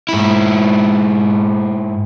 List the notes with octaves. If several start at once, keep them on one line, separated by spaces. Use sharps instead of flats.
G#2 E4